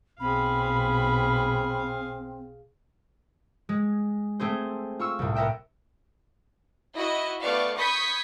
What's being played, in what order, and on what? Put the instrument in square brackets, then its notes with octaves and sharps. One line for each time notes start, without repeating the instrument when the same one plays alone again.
[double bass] B1 [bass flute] C4 [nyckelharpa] G#4 F5 [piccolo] B5
[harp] G#3
A3 C4 G#4 C5
F4 C#6 E6
C2 A2
B3 A#4 E5 G5
[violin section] E4 F#4 D#5
A3 B3 D5 F5 C#6
B5 C#6 D#6 G6 G#6 B6